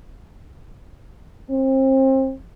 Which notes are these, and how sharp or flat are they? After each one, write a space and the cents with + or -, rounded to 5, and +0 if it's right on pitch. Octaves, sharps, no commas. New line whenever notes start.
C4 +30